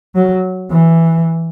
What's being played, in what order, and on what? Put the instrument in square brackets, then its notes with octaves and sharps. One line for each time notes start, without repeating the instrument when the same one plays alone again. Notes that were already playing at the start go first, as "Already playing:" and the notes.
[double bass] F#3
E3